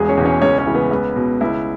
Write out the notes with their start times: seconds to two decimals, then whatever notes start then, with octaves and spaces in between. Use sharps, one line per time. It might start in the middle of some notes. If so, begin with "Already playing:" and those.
Already playing: E1 G#3 G#4
0.09 C#4 C#5
0.17 E2 B2
0.25 C#4 C#5
0.42 C#2 C#4 C#5
0.58 C#4 C#5
0.66 C#3 E3
0.75 B3 B4
0.91 C#2
1.16 B2
1.41 C#2 E4